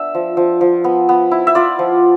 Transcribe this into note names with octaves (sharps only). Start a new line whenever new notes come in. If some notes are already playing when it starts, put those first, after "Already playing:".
Already playing: B3 D4 E5
F3
F3
F3
B3
B3
E4
E5
F4 D5
F3